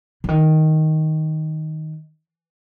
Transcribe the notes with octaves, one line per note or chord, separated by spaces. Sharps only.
D3
D#3